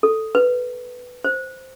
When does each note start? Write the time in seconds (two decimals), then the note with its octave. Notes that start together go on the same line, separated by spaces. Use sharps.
0.03 A4
0.35 B4
1.24 C5